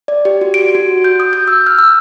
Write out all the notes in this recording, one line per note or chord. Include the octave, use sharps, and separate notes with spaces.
D5
G4
F#4
D7
F#4
G6
D#6
G6
E6
F6
E6